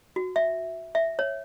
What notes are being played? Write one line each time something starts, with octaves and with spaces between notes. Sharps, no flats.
F#4
E5
E5
C#5